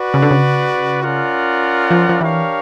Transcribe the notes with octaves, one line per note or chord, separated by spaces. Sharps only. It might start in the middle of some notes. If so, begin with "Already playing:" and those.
Already playing: F#4 B4 D5
C#3
D3
C#3
C#4 F4 A#4 D5 F#5
F3
F3
E3 D4 G4 A#4 C#5 F5